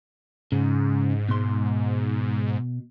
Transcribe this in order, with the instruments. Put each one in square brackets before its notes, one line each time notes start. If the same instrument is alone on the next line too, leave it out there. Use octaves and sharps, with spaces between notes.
[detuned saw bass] G#2 [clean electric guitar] C#3
[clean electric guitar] B2 C6